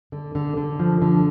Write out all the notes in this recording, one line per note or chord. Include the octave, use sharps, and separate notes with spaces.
D3
D3
D3
F3
D3